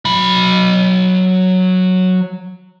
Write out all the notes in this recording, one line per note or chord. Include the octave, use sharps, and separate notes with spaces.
F#3 B5